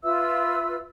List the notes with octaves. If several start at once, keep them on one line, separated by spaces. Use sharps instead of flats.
F4 B4 E5 E6